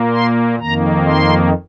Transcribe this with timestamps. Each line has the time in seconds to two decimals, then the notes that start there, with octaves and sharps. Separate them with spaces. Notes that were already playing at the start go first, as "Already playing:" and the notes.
Already playing: A#2 A#3
0.12 C6
0.59 F2 D#3 A#3 A#5
1.06 C6